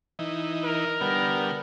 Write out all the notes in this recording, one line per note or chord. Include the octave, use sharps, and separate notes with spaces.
E3 D#4
A#4
D3 G3 B3